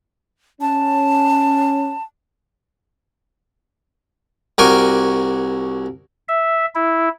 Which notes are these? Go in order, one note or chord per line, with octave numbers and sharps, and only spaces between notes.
C#4 A5
C2 F#4 A#4 G#5 D6
E5
E4